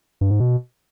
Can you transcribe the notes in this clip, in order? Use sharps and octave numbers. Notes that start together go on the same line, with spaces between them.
G2
G#2
B2